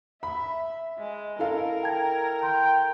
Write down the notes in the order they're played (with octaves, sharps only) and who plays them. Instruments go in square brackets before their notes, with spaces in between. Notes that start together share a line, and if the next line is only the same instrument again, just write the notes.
[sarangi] E5 [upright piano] B5
[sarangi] G#3
[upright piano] E4 A4 F5 [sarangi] A#4
[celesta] G5 A5 G#6
[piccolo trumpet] G5 [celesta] A#5 C6